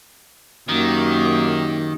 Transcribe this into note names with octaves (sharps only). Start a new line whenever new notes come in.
F#2 D#3 A#3 G4